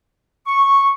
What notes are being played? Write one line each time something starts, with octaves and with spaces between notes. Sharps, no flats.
C#6